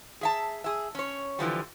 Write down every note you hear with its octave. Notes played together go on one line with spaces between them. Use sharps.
G#4 E5 A5
G#4 E5
C#4 C#5
D3 E3 F3 G3